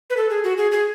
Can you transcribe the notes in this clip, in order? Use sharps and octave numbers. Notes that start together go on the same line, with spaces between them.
B4
A4
G#4
F#4
G#4
G#4